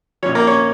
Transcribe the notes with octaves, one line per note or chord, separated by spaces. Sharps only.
A#1 A#2 F3 C#4 C#5
A#3 A#4
C#4 C#5